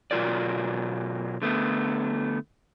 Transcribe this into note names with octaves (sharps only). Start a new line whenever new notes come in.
B2 F#3 F4 A#4 D5
D3 A3 B3